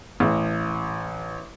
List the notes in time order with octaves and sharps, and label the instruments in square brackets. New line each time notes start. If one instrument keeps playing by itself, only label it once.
[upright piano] A1